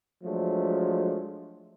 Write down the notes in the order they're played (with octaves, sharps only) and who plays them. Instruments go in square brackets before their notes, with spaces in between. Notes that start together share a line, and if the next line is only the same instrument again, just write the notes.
[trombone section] F3 F#3 G#3 A3 D4